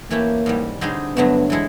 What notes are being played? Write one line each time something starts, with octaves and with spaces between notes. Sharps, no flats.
E3 A3 A#3 C#4 E4 G4
G#2 E3 G3
D3 G3 C4 D#4 G#4
G2 D3 F#3 A3 B3
E3 G#3 E4 A4